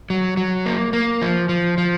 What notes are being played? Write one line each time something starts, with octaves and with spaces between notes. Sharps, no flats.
F#3
F#3
A#3
A#3
F3
F3
F3